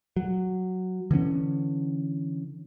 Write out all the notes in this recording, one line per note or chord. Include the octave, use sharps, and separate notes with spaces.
F#3
D3 E3 B3 C#4